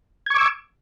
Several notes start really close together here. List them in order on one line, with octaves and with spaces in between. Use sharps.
G#6 C#6 D6 E6